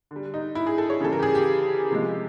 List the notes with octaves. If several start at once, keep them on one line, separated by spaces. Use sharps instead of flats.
D3 G3
D#4
E4
G#4
A4
C#5
C#3 E3 G3 A4
A#4
G4
G#4
G4
C3 F3 G#3